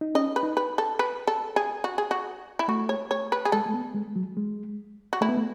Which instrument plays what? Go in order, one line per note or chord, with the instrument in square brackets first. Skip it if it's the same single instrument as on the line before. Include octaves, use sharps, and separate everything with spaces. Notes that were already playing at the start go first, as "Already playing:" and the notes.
[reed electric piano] D#4
[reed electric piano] C#4 [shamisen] D#5
[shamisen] B4
[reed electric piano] D#4
[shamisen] B4
A4
B4
A4
G#4
F#4
G#4
F#4
E4
[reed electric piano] A3 [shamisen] F#4
[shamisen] C#5
C#5
B4
G#4
[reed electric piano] G#3 [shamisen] A4
[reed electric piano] A3
B3
G#3
F#3
G#3
[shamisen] F#4
[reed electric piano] A3 [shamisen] E4
[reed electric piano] B3
A3